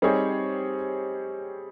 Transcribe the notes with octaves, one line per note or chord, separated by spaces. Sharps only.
G3 C4 D#4 G#4 C#5